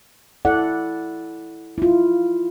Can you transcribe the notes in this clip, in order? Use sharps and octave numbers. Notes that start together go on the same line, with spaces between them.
E4 A4 D5 F#5
E4 F4